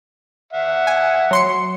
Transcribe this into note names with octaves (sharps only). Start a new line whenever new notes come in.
E5 F#5
G#5
F#3 C6 C#7